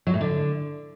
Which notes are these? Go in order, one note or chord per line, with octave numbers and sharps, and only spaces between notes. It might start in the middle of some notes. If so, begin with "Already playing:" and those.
F#3
A2
D3